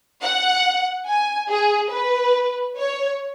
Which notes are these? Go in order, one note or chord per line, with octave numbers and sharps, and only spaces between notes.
F#5
G#5
G#4
B4
C#5